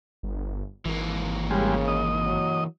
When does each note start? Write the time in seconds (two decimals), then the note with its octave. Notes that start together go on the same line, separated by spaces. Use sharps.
0.23 G1
0.85 G#1 E3 A#3
1.50 C#3 G3 G#3
1.88 D#5
2.26 F#3